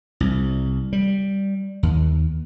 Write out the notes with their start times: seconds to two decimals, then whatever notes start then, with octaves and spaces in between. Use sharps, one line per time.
0.20 C2
0.93 G3
1.83 D#2